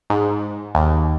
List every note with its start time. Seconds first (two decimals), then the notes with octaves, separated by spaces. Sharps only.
0.10 G#2
0.75 D#2